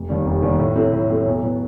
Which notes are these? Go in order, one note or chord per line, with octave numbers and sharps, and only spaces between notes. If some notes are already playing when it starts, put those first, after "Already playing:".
Already playing: F1
D#2 D#3 G3
F1
D#2 D#3 G3
A2
F#3 A3 C4 E4
A2
F#3 A3 C4 E4
B1
A2 F#3 B3